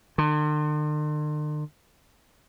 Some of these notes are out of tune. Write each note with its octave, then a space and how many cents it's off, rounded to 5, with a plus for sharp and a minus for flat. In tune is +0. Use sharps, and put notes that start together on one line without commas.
D3 +45